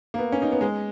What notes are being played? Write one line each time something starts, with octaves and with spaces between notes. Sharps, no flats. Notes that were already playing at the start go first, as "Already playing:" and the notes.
A#3
B3
C#4
D#4
B3
G#3